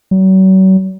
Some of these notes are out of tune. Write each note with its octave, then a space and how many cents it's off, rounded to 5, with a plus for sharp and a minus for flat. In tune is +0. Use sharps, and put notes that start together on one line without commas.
F#3 +40